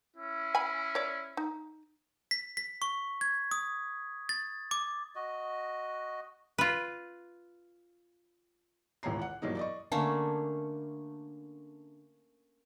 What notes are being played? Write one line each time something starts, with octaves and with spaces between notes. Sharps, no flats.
C#4 E4
G#5 B5
C#5 D5
D#4
B6
B6
C#6
G#6
D#6
A6
D6
F#4 D#5
F4 B4
D#1 C#2 E3 C#5 A#5 C7
F#5
G2 B2 E3 F#3 A#3 D#4
D5 D#5 C#6
D3 A3 A#3 C#4